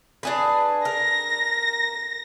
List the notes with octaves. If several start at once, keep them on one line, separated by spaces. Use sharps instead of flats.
D4 G#4 B4
A#4 A#6